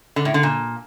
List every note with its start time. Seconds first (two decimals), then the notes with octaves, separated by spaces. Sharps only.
0.16 D3
0.25 A2
0.34 D3
0.43 A#2